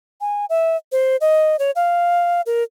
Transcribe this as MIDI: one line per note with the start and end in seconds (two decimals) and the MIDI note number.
0.21 0.45 80
0.49 0.76 76
0.92 1.16 72
1.21 1.56 75
1.59 1.71 73
1.76 2.41 77
2.46 2.63 70